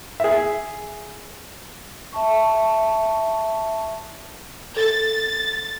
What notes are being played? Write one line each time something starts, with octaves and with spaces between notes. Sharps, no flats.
G#4 E5
E5 A5 C#6
A4 A6